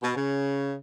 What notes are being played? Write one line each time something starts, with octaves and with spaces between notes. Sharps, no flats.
B2
C#3